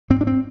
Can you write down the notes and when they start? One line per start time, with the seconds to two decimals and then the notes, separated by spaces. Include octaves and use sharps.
0.10 G#2 C4
0.21 D4
0.27 C4